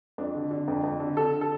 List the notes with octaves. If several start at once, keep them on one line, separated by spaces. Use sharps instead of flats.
F2 D4
D3
D3
F2
F2
D3
D3 A4
A4